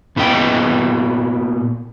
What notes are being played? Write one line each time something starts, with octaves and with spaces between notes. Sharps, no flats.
A#2 B3 E4 F#4 D#5 G5